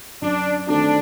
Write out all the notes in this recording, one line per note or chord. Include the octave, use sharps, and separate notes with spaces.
F#2 D4
D#3 A3 C4 D4 F#4